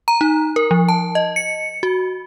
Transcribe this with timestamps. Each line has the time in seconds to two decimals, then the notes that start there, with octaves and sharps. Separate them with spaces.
0.08 A#5
0.21 D#4
0.56 A#4
0.71 F3
0.89 A5
1.15 D#5
1.36 C#7
1.83 F#4